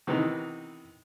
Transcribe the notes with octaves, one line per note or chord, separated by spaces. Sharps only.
C3 D#3 E3 B3 D#4